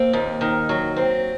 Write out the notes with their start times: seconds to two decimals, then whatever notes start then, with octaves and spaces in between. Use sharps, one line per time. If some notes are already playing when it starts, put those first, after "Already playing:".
Already playing: A#3 C4
0.13 D#2
0.41 D#3
0.69 F#3
0.96 C4